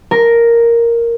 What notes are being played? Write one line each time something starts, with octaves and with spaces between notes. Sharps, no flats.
A#4